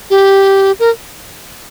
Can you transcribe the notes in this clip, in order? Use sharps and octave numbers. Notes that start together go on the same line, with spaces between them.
G4
A#4